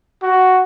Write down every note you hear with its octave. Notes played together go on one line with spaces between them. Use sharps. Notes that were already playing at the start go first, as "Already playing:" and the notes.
F#4